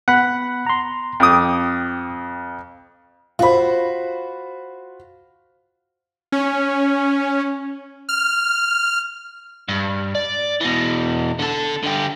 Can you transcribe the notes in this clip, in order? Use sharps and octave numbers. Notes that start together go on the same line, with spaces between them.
B3 F#5 B5
A#5 C6
F2 G5 D6 D#6
F4 F#4 C5 B5
C#4
F6
G2
D5
B2 E3
D3 A4
D3 G4